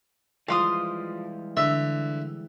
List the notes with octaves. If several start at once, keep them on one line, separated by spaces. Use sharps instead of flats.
E3 F3 G3 G#3 F5 C6 D#6
D3 E5